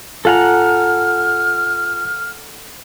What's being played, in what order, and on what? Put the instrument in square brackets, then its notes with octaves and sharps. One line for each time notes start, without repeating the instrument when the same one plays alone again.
[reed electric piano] G#2 F4 G#5 [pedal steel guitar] A4 F#5 A#5 [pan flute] F6